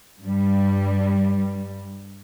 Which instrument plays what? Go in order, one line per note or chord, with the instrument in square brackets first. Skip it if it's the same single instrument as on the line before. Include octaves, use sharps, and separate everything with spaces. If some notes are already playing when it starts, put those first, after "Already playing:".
[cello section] G2 G3